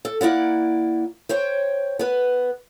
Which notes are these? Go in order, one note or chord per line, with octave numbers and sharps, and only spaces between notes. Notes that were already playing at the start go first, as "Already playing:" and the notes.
A4
A#3 E4 D5 F#5
C5 C#5 G5
B3 B4